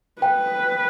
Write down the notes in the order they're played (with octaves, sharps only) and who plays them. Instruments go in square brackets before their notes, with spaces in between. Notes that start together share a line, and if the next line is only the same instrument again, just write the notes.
[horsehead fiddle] B4 [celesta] G5